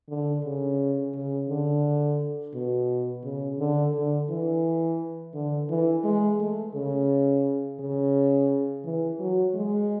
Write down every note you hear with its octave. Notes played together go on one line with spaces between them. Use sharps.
D3
C#3
C#3
D3
B2
C#3
D3
D3
E3
D3
E3
G#3
A3
C#3
C#3
E3
F#3
G#3